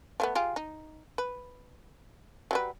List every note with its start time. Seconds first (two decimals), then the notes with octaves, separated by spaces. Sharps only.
0.20 F3 A3 B3
0.35 F4 G4 G#4
0.56 D#4
1.18 B4
2.51 F#3 G3 B4